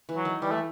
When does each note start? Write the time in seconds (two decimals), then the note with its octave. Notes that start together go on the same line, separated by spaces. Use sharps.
0.09 E3
0.17 F#3
0.25 D#3
0.42 E3 G3
0.51 A3